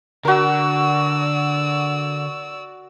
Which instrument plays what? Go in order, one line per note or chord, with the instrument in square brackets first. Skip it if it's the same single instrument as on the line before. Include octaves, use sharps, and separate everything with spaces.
[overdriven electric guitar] D3 [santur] F#4 A#4 [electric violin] D5 E6